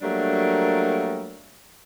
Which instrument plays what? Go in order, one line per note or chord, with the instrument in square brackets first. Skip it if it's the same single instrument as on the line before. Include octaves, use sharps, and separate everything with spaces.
[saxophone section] F#3 G3 A3 A#3 D4 A#4